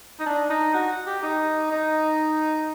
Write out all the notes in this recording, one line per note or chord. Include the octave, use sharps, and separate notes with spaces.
D#4
D4
D#4
F#4
G4
D#4
D#4